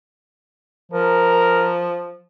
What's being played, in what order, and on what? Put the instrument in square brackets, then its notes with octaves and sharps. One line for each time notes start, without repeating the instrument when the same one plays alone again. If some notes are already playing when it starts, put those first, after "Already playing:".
[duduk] F3 [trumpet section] A#4